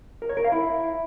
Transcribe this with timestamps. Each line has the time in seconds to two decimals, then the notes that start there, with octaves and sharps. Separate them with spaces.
0.22 A#4
0.29 C#5
0.37 A#4
0.44 F5
0.52 E4